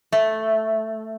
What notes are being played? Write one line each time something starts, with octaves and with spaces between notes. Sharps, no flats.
A3